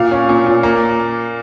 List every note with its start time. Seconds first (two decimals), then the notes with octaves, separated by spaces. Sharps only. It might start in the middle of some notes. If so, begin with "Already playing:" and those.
Already playing: A#2 F5
0.11 C#4
0.29 A#2
0.46 A#2
0.63 A#3